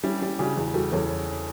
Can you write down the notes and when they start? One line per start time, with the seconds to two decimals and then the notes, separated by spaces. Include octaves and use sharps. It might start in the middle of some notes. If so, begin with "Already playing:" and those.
0.03 G3 C#4 E4
0.22 G3
0.39 C#3 D4 F#4
0.57 E2
0.74 G3 F#4 A4
0.92 E2 A4 C#5